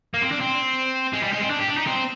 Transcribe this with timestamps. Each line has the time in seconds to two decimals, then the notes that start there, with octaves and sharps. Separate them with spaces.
0.14 A#3
0.22 C4
0.31 D4
0.40 C4
1.13 G#3
1.23 G3
1.32 G#3
1.41 C4
1.50 D4
1.59 G4
1.68 D4
1.77 D#4
1.87 C4